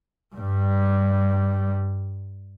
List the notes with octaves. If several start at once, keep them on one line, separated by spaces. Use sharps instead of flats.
G2 G3